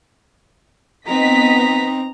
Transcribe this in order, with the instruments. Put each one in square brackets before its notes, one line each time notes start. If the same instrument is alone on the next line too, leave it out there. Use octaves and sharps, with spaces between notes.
[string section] B3 D#5 B6 [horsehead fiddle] C4 D#4 [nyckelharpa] A#5